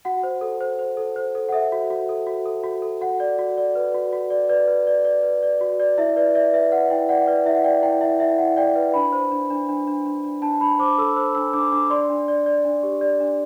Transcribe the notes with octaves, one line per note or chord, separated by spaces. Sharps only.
F#4 F#5
C5
A4
C5
C5
A4
C5
A4
F#5
A4 E5
F#4
F#4
A4
F#4
A4
F#4
A4
F#4 F#5
D5
F#4
D5
B4
F#4
F#4
D5
B4 D5
B4
D5
D5
B4
D5
F#4
D5
E4 E5
B4 D5
D5 E5
B4 E5
B4 F#5
E4 G5
D5 F#5
B4 D5
E4 E5
F#5
D5 G5
E4 G5
E4 E5
E4 E5
E4 F#5
D5 G5
B4
D4 B5
C5
D4
D4
D4
D4
D4
D4
D4 A5
D4 B5
C5 D6
A4 E6
C5 E6
D4 E6
D4 D6
D4 D6
D5 C6
D4
D5
D5
D4
G4
D5
D4